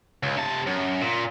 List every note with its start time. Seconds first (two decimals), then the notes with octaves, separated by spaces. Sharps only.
0.23 C#2
0.37 C3 A5
0.67 F#2
1.01 A#2